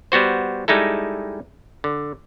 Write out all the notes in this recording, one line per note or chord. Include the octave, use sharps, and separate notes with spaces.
G3 B3 F#4 C5
G3 G#3 D#4 E4 A4
D3